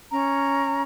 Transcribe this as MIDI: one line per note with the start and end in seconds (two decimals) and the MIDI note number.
0.11 0.83 61
0.11 0.83 82